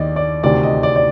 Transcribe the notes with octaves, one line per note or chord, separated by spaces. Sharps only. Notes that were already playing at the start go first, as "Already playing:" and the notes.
Already playing: D#2 D#3 D5 D#5
D5
D2 C3 D#3 D5
D#5
D5
D5